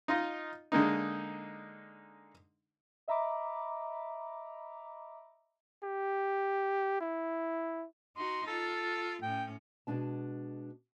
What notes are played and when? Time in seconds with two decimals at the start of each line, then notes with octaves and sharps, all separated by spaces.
0.08 D#4 F4 D#5
0.72 D3 G#3 A#3 D#4
3.08 D#5 E5 A#5 B5 D6
5.83 G4
7.01 E4
8.17 D#4 F#4 C6
8.47 F4 A4
9.23 A2 C#4 G5
9.87 B2 G#3 D4 A5